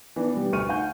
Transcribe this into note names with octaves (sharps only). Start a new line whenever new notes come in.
E3 B3 D4
G3
D2 C#6 F6 D#7
F5 F#5 G#5 G6